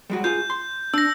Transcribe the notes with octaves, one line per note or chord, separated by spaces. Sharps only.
G3 G#3 F#4
F4 G#4 G6
C6
D4 E6 A#6